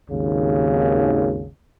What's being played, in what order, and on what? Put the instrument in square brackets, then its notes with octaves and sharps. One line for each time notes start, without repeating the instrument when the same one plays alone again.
[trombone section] G#1 D#2 C#3